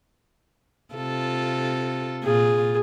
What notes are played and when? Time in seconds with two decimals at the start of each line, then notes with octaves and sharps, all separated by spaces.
0.95 C3 F4 A4
2.23 A#2 F4 G#4